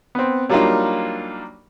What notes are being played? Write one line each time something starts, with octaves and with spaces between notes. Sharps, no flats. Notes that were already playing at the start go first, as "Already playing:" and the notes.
B3 C4
F#3 G3 A#3 D4 D#4 F4